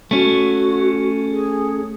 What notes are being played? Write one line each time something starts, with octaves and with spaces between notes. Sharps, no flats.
A3 C#4 F#4
G#4